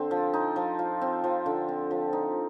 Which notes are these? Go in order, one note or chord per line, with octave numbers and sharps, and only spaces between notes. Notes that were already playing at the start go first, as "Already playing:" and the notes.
Already playing: D3 C4
F3
D#4
F3
F4
C4
F3
D3
C4
F3
D#4